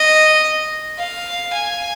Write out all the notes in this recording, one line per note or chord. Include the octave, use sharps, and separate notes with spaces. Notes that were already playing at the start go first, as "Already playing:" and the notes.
Already playing: D#5
F5
G#5